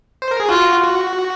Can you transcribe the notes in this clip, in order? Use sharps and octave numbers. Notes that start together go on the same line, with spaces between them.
C5
A#4
G#4
F4 F#4
F#4